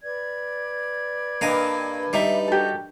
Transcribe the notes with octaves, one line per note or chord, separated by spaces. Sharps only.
B4 D5 G#6
G2 A#3 D#5 G#5
G3 D#4 G4 E5
F#4 G4 A4 A#4